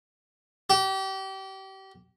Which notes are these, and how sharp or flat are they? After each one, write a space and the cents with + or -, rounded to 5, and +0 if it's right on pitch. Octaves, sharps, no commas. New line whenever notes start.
G4 -30